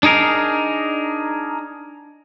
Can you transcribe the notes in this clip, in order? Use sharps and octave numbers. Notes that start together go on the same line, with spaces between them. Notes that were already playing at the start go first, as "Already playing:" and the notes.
D4 D#4 G#4 A#4